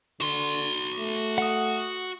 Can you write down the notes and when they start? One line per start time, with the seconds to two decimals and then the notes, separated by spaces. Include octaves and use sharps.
0.20 D3 F#4 C6
0.99 A3
1.38 F#5 D#6